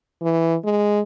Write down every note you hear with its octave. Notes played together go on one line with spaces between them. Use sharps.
E3
G#3